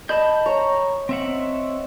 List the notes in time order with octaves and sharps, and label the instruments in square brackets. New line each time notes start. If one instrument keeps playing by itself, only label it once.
[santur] D#5 [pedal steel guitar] A5 B5 G6
[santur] C#5 [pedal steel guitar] A#5
[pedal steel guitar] C4 E5 F#5